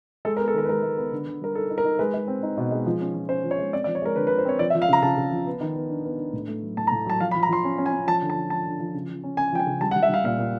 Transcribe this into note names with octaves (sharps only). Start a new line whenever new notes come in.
G#3 A4
A#4
B3
A4
D#3 A#4
B4
G#3 A#4
G#3
B3
D3
D3
G3 A#4
D#4 A4
D#4
A#4
D#4
G#3 B4
G#3
C4
D#4
B2
G#3
F3
C#4
F3
C#4 C5
F3
C#5
G#3
C4 D5
D5
F3
C#5
G#3 A#4
D3 B4
B4
D3
C5
C4 C#5
F3 D5
E5
F3
F5
C#3 A#5
C#3 A5
C#3
F3
B3
D#3
B3
D4
B3
D4
A2
A3
F#3
A2 A5
A#5
A2
F#3 A5
F3 F5
B5
F3
A#5
F3 C6
C#4
C#4
G#5
C#4
F3 A5
D3
A5
F3
F3 A5
D3
F3
C#3
F3
C#4
C#4 G#5
F3 G5
G#5
C#3
G3 A5
F#5
G3
E5
G3 F5
A#2 F5
A#2